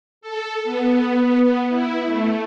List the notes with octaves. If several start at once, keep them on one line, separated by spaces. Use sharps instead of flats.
A4
B3
B3
E4
A3